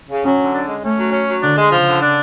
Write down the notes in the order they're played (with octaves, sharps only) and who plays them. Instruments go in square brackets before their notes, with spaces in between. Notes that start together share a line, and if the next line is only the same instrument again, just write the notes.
[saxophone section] C#3
[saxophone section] F#3 [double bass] C#4
[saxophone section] D3
D4
G#3
[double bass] A3 [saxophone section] C#4
[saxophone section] F#3
C#4
F#3
[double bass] D3 [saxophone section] D4
[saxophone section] G#3
[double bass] C#3 [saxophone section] F3
[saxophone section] D3
D4